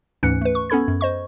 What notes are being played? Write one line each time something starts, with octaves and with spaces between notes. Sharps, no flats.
D2 G#2 E3 C#4 F#6 C#7
A3 B4
C#6
B3 C#4 A4 B5 G#6
F#2
C5 D#5 C#6